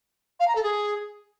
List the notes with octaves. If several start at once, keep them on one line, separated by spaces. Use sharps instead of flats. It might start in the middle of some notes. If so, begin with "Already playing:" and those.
F5
A#5
A4
G#4